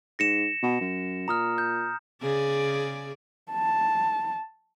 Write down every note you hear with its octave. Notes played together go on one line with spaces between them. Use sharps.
G#2 A#6 C#7 E7
B2
F#2
A#2 A#5 D#6 F6
G6
C#3 G#4 D5
A5